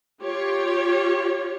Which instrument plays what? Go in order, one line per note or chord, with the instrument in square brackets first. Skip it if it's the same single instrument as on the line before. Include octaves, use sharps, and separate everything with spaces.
[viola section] F4 G4 C#5